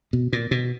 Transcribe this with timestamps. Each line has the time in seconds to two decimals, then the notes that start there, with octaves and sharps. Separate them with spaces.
0.13 B2
0.33 A#2
0.51 B2